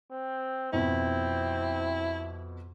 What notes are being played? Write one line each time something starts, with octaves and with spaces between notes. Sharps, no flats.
C4
F2 B2 C4 E4